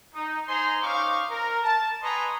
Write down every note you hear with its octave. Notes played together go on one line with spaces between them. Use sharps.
D#4
D#4 C5 G#5 A#5 C6
C#4 D#4 C5 F5 C#6 D6
A#4
A5
B4 D#5 G#5 A#5 C6 C#6